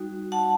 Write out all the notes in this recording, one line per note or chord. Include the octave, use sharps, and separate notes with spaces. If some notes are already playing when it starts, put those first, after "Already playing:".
Already playing: G3 D#4 F#4
F#5 A5